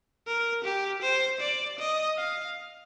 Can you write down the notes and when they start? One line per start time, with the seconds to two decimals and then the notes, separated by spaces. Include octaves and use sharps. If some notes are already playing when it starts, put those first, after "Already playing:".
0.27 A#4
0.64 G4
1.02 C5
1.40 D5
1.79 D#5
2.18 F5